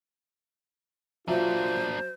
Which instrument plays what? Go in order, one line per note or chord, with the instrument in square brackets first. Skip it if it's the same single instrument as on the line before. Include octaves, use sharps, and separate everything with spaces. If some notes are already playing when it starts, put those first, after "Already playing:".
[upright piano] F#3 E5 [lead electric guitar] A#3 D4 [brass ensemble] F4 [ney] C5